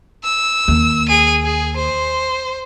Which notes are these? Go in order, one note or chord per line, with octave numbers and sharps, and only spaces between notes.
E6
D#2
G#4 D#7
G#4
C5